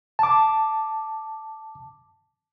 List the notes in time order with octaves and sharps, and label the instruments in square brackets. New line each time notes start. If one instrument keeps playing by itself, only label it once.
[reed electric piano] A5 D6